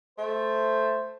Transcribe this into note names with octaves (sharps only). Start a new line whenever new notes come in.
A3 C5